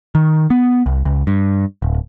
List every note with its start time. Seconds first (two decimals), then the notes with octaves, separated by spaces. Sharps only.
0.15 D#3
0.50 B3
0.86 C2
1.05 C#2
1.27 G2
1.82 D1